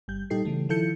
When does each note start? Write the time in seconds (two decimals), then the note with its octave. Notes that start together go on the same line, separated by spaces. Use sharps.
0.08 G1 G3 G6
0.30 A#2 G3 D#4 G4 A4 C7
0.45 C#3 E3 A3
0.69 D#3 F3 E4 A4 G6 C#7